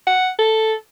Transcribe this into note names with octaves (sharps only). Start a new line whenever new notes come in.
F#5
A4